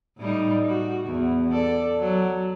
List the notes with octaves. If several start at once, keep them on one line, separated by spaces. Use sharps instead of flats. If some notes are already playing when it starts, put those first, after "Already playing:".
A2 G3 D#4
F#4
E2
A4 D5
F#3